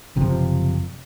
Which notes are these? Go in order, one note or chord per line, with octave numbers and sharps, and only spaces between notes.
F#1 C3 F3